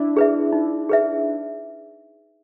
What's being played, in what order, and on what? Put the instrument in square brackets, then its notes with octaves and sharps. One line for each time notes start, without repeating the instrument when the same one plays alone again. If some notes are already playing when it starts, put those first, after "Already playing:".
Already playing: [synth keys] D4 E4
[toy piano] G#4 B4 E5
D#4
G#4 B4 E5